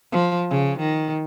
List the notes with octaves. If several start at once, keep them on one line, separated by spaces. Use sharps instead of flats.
F3
C#3
D#3